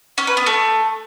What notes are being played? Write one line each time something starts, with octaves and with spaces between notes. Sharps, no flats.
C#4
B4
B3
A3